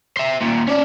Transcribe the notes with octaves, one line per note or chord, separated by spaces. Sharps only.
C5 E5
D#2 A#2
C#4 D5